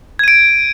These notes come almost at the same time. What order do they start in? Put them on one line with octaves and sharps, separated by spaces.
G#6 D#7 D7